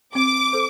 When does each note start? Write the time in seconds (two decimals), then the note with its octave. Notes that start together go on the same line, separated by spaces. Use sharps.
0.15 C4 D6
0.53 A4 C5